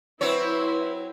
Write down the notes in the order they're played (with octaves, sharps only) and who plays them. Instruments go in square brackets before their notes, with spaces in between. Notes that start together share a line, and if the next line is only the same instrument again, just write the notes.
[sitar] F#3 C4 C#5 [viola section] E4 [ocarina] B4